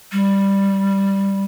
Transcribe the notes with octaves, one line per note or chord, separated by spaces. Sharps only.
G3